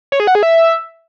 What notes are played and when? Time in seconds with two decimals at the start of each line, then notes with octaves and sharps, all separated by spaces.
0.12 C#5
0.20 G#4
0.27 F#5
0.35 G#4
0.43 E5